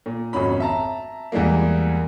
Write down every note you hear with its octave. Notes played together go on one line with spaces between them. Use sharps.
A#2
G#1 F2 B2 C#4 B5
E5 A5 A#5
E2 E3 G3 G#3 A#3